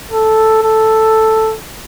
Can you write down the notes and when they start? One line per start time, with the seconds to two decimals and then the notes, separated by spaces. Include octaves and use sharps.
0.11 A4
0.62 A4